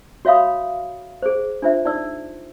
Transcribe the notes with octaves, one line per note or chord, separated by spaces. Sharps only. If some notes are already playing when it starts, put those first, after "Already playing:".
F#4 C#5 E5 F5 B5 D#6
G#4 C5
D4 F4 C5 E5
D#4 D5 E6